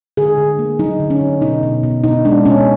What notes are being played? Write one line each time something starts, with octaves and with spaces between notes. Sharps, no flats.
D3 G#4
D3
A#3
F#3 D#4
D3
C#4
D3
B2 D#4
B2
B2
B2 D#4
G#3 D4
B2 C#4